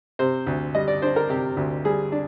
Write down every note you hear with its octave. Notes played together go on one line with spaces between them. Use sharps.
C3 C5
D2
G3 D#5
D5
D4 C5
A#4
C3 G4
D2
G3 G#4
D4